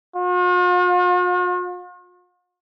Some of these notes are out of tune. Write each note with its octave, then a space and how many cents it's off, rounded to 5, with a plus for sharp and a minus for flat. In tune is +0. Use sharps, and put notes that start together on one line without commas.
F4 +45